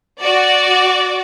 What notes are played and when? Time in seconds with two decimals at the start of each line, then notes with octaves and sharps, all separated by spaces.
0.22 F#4 D5